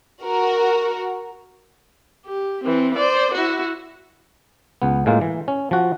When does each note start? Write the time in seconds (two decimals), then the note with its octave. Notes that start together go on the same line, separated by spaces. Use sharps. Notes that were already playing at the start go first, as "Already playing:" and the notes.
0.23 F#4 A#4
2.26 G4
2.64 E3 C4
2.96 C5 D5
3.34 E4 F#4
4.82 C#2 B3
5.06 A2 G#3 A#3 F4
5.21 E3
5.48 C#4
5.71 F3 F#4